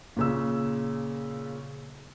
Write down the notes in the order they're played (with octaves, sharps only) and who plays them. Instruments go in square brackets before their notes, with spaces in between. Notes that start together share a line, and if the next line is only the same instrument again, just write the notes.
[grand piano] A#2 C#3 E6